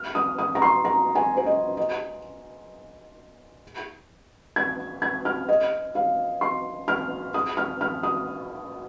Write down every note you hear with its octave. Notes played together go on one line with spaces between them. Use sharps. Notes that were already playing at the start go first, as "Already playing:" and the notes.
Already playing: F6
D#6
D#6
A#5
C6
A#5
G#5
C5
D#5
D#5
G#6
G#6
F6
D#5
F5
C6
F6
D#6
F6
F6
D#6